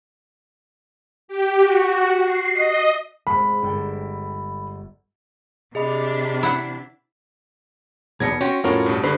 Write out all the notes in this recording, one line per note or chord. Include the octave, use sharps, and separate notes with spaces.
G4
F#4
C7
D#5
G#2 G#3 B5
G1 A4 G5
C3 D4 G#4 D#5 B5
E4 F#5
B1 E2 B2 G#6 A#6 C#7
C#4 F#4 G5 C6
F2 A2 C#4 F4 F#4 A#4
G2 B2
G2 D3 C5 B5